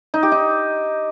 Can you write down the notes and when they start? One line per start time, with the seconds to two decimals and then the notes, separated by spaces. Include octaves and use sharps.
0.14 D#4
0.23 G4
0.32 D#4